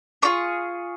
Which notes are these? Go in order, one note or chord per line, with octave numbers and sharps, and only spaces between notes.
D4 F4 G#4 C#6